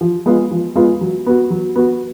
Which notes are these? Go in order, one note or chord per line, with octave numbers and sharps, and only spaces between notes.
F3
G#3 B3 F4
F3
G#3 B3 F4
F#3
B3 F#4
F#3
B3 F#4